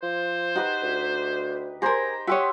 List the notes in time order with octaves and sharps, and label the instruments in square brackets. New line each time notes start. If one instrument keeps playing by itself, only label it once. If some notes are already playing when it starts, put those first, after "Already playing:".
[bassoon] F3 [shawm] C5
[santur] D#4 G4 B4 [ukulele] F#4
[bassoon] D2
[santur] G4 C5 B5 [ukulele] G#4 A#4 [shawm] A#5
[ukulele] F#4 G4 C#5 [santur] E5 C6 D#6